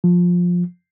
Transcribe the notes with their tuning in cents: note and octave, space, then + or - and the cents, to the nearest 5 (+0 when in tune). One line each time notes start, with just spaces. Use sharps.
F3 +15